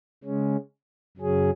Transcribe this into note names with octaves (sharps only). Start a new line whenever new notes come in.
C#3 G#3 C#4
F#2 C#3 F#3 C#4 G#4